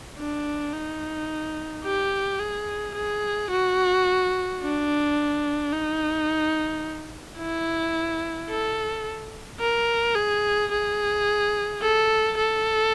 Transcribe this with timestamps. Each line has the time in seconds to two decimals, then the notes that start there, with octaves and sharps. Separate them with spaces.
0.18 D4
0.73 D#4
1.84 G4
2.39 G#4
2.95 G#4
3.50 F#4
4.61 D4
5.72 D#4
7.38 E4
8.49 A4
9.60 A#4
10.15 G#4
10.71 G#4
11.81 A4
12.37 A4